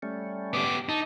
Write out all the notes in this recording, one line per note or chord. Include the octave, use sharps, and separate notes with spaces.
G3 A3 C#4
B3 G4 D6
D#4 A5